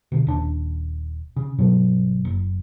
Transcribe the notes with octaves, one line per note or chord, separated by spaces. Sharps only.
B2 D3
D#1 D4
C#3
G1 G2 B2 F#3
F#1